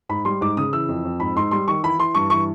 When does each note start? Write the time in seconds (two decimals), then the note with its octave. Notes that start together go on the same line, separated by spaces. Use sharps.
0.09 G#2 B5
0.25 G3 C6
0.41 G#2 D6
0.57 C#3 D#6
0.73 E3 E6
0.88 F2
1.04 F2
1.20 G#2 B5
1.36 G#2 C6
1.51 G3 C6
1.68 D#3 C#6
1.83 E3 B5
1.99 E3 C6
2.15 G2 C#6
2.30 E3 C#6